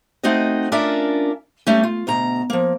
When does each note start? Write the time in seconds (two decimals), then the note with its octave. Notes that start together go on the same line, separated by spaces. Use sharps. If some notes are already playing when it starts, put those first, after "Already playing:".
0.23 A3 C4 D#4 F#4 D#5
0.72 C#4 D4 F4 A#4 D5 E5
1.67 G3 A3 C#4
1.83 F4
2.07 D2 B2 A#5
2.50 F3 A#3